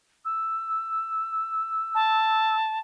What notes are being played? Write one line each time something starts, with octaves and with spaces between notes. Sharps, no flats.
E6
A5